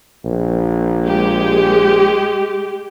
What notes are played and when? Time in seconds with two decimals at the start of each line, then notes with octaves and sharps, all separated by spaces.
0.25 A#1
1.04 G#3 G4